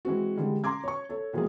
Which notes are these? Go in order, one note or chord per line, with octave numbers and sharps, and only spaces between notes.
E3 G#3 C4 F#4
D3 E3 G3 G#3
A#5 C6 D6 G#6
C#5 C#6
A4 C#5
B2 E3 F3 G#3 A#3 G#4